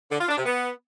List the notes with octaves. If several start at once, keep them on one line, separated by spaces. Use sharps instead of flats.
D3
F4
D4
C3
B3